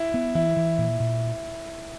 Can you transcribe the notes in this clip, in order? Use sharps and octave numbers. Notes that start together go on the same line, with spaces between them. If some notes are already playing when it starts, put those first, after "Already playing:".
Already playing: E4
B3
E3 E4
E3
A#2
A#2